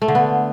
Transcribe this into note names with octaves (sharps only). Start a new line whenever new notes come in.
A3
D3
B3